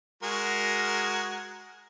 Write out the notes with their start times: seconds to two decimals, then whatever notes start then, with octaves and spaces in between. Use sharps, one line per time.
0.23 G#3 F#4 A#4